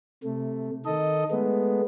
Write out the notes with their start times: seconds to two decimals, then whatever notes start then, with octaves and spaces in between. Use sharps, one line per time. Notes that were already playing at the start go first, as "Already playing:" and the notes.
0.24 C3 A3
0.86 D#3 A4 D#5
1.31 G#3 A3 B3